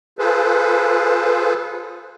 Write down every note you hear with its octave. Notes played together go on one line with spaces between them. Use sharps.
F4 G#4 A4 B4 C5